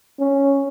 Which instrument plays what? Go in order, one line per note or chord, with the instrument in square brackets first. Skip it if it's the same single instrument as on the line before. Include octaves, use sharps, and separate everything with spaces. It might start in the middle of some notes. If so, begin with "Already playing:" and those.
[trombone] C#4